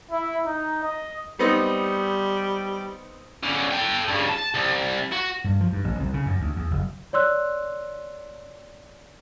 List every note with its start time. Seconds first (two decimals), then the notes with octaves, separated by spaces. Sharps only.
0.11 E4
0.46 D#4
0.84 D#5
1.39 G3 B3 C4 D#4
3.43 D3 C#4
3.71 A4 G5
4.08 G2 C#3
4.29 A5
4.54 C2
5.12 F#4
5.44 G2
5.61 F3
5.72 G2
5.84 A1
6.00 C2
6.14 C#3
6.26 F#2
6.40 D2
6.56 E2
6.71 F#1
7.13 C#5 D5 C6 E6 F#6